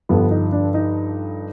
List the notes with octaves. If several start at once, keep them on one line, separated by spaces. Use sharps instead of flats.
G2 D3 F3 B3
D#4
D4
D#4